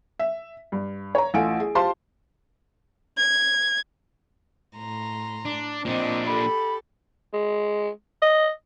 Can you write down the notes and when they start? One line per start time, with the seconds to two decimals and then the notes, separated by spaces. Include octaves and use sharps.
0.19 E5
0.72 G2
1.15 C#5 A#5
1.34 A1 A3 F4 A4 G#5 D7
1.60 G#4
1.75 F4 G4 C5 A5 C6
3.17 G#6
4.76 A2 A#5 C6
5.45 D4
5.85 A#2 C4 D4 D#5
6.27 G4 A4 B5
7.33 G#3
8.22 D#5